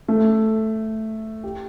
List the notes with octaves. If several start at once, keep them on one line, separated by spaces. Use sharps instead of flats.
A3
G4